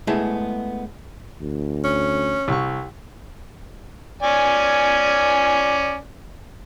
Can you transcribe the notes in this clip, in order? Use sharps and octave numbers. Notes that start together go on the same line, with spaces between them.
G#3 A3 B3 E4 G#4
D2
C#4
C2 C#6
C#4 D5 G#5